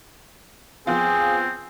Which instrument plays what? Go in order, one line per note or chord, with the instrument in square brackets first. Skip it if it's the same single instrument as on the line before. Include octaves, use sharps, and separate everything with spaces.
[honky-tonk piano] F3 B3 F4 [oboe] C4 [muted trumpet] G#4